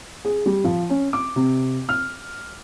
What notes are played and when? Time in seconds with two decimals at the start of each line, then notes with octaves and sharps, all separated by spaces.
0.25 G#4
0.46 G3
0.64 F3
0.90 C#4
1.13 D6
1.36 C3
1.89 F6